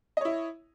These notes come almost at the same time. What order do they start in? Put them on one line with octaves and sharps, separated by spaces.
D#5 C#5 E4